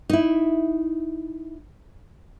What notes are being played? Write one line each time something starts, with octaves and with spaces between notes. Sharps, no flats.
D#4 E4